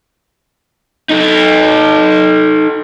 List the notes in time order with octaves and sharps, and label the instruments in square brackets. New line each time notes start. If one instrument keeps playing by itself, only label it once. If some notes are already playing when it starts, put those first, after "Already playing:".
[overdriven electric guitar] D#4 A4